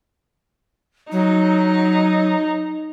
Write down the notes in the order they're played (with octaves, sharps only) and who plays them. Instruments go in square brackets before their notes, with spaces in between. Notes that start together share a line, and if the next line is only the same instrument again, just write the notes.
[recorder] F#3 [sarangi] D#4